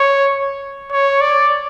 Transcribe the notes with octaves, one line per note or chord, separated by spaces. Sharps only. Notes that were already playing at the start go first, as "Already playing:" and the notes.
Already playing: C#5
C#5
D5